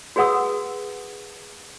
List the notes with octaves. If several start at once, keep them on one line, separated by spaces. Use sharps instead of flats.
F#4 G#4 B4 F#5 D#6 E6